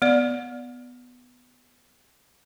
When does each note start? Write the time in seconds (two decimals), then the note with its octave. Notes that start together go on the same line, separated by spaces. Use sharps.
0.02 B3 D5